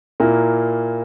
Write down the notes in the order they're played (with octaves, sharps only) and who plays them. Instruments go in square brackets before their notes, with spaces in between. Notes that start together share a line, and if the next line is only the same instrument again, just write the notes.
[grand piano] A#2 A#3 E4